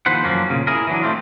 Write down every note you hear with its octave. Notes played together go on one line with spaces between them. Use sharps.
D#2 F3 B4 C5 F#5
F#2 F3 A#3 C#4
A#2 C#3
E4 G#4 A#4
E3 F#3 D4
A3 C4 F4